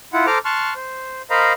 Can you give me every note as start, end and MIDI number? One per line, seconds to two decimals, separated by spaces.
0.13 0.26 64
0.13 0.26 65
0.13 0.26 78
0.27 0.38 69
0.27 0.38 72
0.27 0.38 82
0.27 0.38 86
0.27 0.38 89
0.45 0.74 81
0.45 0.74 84
0.45 0.74 85
0.45 0.74 89
0.45 0.74 90
0.76 1.22 72
1.30 1.53 70
1.30 1.53 72
1.30 1.53 75
1.30 1.53 77
1.30 1.53 82
1.30 1.53 83